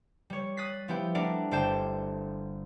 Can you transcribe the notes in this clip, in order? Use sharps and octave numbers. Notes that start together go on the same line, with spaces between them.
G3 C#5
D#6 F#6 A6 B6 C7
F3 B3 E4 G4 G5
G3 A3 D4 A#4 D5 F#5
G1 A4 C5 D5 G5 E7